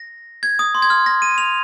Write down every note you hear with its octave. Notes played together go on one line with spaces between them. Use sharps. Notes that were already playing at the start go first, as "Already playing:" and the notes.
Already playing: A#6
G#6
D#6
C6
G#6
F6
A#6
D#7
F7